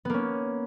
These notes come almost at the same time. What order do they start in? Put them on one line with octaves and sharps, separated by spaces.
B3 A#3 C#4